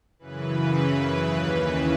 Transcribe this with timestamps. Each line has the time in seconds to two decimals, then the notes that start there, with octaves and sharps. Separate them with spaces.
0.19 F#2 C#3 E3 B4
1.19 D#2 C#3 E3